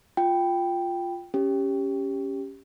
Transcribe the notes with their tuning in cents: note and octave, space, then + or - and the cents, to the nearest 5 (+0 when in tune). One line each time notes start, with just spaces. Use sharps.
F4 +0 G5 +0
C#4 +0 G4 +0